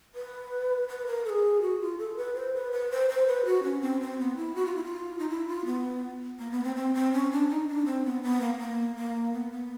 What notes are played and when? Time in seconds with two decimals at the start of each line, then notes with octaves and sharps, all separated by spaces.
0.15 B4
0.88 B4
1.06 A#4
1.25 A4
1.30 G#4
1.62 F#4
1.81 F4
1.98 A4
2.17 B4
2.35 C5
2.54 B4
2.72 B4
2.91 C5
3.09 C5
3.27 B4
3.45 F#4
3.63 C#4
3.82 C4
4.01 C4
4.19 B3
4.37 E4
4.55 F#4
4.66 F4
4.76 E4
4.84 F4
5.19 D#4
5.29 E4
5.48 F4
5.65 B3
6.39 A#3
6.51 B3
6.64 C4
6.76 C4
6.94 C4
7.13 C#4
7.31 D4
7.49 D#4
7.67 D4
7.85 C4
8.05 B3
8.23 B3
8.41 A#3
8.59 A#3
8.96 A#3
9.33 B3
9.51 B3